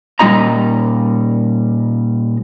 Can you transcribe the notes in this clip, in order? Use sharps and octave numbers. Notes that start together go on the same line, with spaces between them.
A#2 G3 C4 E4 D#5 A#5